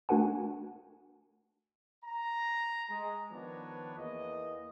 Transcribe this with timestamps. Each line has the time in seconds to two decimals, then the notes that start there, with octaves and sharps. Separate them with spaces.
0.09 A3 D4 F#4 A#4 F#5 G#5
2.05 A#5
2.90 G#3
3.31 D#3 F3 B3 D4 B4 C#5
3.98 E2 A#3 B3 D#5